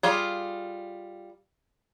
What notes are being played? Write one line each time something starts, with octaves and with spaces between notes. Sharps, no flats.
G3 F4 G#4